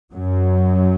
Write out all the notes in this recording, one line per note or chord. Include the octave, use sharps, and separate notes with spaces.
F#2 F#3